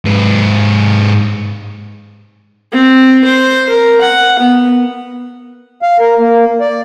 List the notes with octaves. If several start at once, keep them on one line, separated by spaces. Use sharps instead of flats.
G#2 B4
C4
C5
A#4
F#5
B3
F5
A#4
A#3
D5